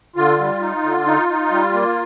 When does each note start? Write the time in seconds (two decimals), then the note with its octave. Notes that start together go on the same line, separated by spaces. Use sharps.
0.16 D3 F4
0.39 G3
0.61 D#4
0.83 D3
1.06 D#4
1.29 D#4
1.50 G3
1.73 A#3